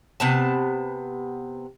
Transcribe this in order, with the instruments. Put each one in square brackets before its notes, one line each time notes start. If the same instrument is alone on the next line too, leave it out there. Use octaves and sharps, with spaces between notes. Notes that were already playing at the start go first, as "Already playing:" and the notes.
[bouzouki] C3 B3 A5